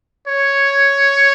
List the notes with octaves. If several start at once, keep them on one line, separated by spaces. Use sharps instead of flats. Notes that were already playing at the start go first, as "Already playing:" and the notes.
C#5